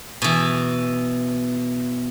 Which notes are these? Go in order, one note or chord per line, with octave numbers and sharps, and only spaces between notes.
B2 E3